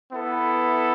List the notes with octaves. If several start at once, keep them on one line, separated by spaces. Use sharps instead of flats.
B3 E4 A4